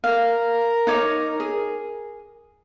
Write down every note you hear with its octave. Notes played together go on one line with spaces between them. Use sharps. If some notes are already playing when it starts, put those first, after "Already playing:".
A#4 F5
D#4 C#5 D6
G#4